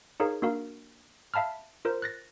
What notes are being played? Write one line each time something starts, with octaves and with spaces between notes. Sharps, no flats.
D#4 G#4 A#4 C#5 F5
A#3 D4 F#4 A#4 F5
E5 F5 A5 B5 F6
F4 A#4 C5
F#6 A6 A#6